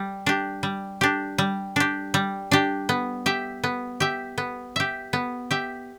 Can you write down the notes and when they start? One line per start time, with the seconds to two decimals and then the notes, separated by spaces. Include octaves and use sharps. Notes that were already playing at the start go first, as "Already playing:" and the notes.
Already playing: G3
0.26 D4 G4
0.63 G3
1.01 D4 G4
1.38 G3
1.76 D4 G4
2.14 G3
2.51 D4 G4
2.89 B3
3.26 G4 E5
3.64 B3
4.00 G4 E5
4.38 B3
4.76 G4 E5
5.13 B3
5.51 G4 E5